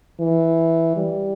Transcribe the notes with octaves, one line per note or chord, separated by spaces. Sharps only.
E3
G3